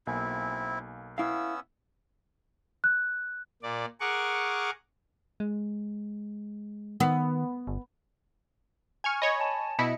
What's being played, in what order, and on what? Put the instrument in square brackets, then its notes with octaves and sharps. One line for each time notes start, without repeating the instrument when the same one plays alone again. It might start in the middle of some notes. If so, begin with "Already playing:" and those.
[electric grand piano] B1 A#3 G#5 [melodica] C4 E4
[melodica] B3 C#4 E6 [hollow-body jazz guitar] E4 F5
[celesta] F#6
[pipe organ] A#2 D5
G#4 A#4 F#5 C#6 D6
[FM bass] G#3
[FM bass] D#3 [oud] B3
[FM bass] G1
[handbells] G#5 [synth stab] C#6 F6 G#6
[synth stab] C#5 D#5 [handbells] B5
[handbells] G#5 A5
[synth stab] B2 B3 E4 [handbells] D#5 C#7